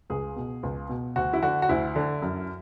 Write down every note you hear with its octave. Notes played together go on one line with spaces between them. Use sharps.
C#2 G#4
B2
C#2
B2
D2 F#4
E4
D3 F#4
F#4
D2 E4
D3
F#2